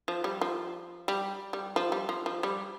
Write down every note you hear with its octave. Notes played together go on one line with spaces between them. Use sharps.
F3
G3
F3
G3
G3
F3
G3
F3
F3
G3